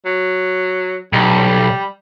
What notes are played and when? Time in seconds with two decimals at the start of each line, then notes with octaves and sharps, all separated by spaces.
0.06 F#3
1.13 B1 G3